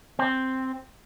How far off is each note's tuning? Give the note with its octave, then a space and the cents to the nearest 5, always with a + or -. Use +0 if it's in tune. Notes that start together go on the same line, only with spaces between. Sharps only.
C4 +0